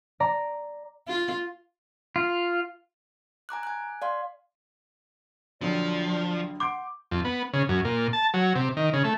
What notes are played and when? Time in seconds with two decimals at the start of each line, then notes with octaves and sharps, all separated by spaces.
0.20 D5 A#5
1.08 F4
2.16 F4
3.49 G#5 A#5 D6 F#6
3.63 G#5 F#6
4.02 D5 F5 C6
5.61 A#1 D3 F3 F#3 D5
6.60 F#5 C6 D6 G6 D7
7.11 F2
7.25 B3
7.53 C#3
7.69 F#2
7.85 A#2
8.13 A5
8.34 F#3
8.55 C3
8.77 D#3
8.93 C#3
9.04 A3